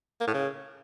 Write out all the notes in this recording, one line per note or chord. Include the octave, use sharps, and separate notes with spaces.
A#3
A2
C#3